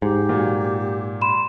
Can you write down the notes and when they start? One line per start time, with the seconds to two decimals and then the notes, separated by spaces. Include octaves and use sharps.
0.02 G#2 G4
0.29 A#2 F#3
1.21 B5 C6 E7